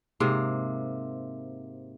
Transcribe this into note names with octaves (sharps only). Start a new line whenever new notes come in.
G#2 C3 A#3